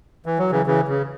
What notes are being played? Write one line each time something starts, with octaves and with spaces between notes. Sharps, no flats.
E3
F#3
C#3 E3
C#3 E3
C#3